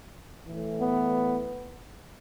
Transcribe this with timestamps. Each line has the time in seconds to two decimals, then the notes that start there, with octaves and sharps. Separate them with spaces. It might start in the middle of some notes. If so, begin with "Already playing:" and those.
0.46 A2 E3
0.79 B3